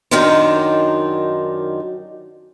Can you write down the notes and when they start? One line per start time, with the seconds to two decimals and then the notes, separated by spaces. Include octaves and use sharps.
0.11 F#2 D#3 F#3 D4 D#4 F4